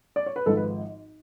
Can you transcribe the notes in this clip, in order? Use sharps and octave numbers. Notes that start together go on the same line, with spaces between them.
D5
C#5
B4
G#1 G#2 F3 A4
B4